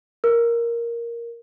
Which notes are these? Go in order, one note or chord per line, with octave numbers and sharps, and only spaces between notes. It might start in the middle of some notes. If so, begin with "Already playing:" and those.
A#4